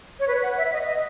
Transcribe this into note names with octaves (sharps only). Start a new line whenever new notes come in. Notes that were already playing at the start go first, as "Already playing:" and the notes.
C#5
B4
F#5
E5
D#5
D#5